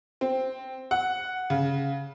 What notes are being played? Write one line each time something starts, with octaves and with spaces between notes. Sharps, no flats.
C4
F#5
C#3